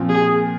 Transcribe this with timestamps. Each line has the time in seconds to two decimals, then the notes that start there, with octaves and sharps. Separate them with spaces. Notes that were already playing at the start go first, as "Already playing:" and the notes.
Already playing: A#2 F3 C4 F4
0.09 G#4